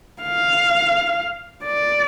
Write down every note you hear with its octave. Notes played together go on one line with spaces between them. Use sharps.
F5
D5